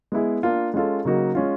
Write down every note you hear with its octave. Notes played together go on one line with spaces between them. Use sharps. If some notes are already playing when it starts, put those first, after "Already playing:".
G#3 B3 E4 G#4
A#3 D4 F4
G#3 C#4 F4 A4
C#3 F#3 A#3 D#4 F#4
G#3 C#4 F4